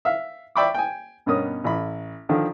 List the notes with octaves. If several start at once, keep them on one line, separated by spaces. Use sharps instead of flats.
E5 F5
D5 E5 G5 B5 C#6 D6
G5 G#5
G2 B2 B3 C#4 A#4 D#6
A1 B5
D3 D#3 F3